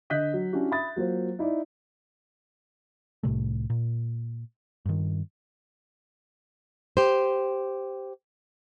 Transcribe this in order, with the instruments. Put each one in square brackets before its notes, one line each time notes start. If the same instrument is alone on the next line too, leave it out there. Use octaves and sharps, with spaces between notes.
[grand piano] D3 D#5 F#6 G6 B6
F#3
C#4 D4 E4 F#4 G4
E5 B5 D#6 A6
F#3 A#3 F4 C5
D#4 E4 D5
[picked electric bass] C2 A2 C3 A3
A#2
G2 D#3
[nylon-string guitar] G4 C5